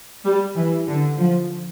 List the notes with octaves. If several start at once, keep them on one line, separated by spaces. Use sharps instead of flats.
G3
E3
D3
F3